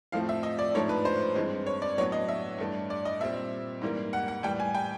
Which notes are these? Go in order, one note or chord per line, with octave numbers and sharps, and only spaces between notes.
A2 F3 A3 C4 F5
E5
D#5
D5
G#2 F3 A3 D4 C#5
B4
C5
G2 E3 G#3 C4
C#5
D5
A2 F#3 B3 D4 C#5
D#5
E5
G2 E3 A3 D4
D5
D#5
A#2 G3 C4 E5
G#2 E3 G3 A#3
F#5
F#5
A2 E3 G3 G5
G#5
G5